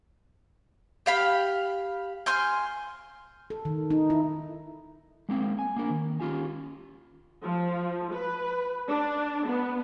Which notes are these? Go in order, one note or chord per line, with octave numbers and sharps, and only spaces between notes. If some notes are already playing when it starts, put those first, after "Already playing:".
G4 F5 B5
G#5 C6 F6 G6
A4
D#3
D#4
E4
G#3 A#3 C4
G#5
A#3 D4 A#4
D#3
C#4 F4 G4 G#5
F3
B4
D4
B3